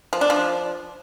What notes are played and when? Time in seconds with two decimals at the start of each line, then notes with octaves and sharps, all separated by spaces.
0.13 F3
0.21 D4
0.30 F3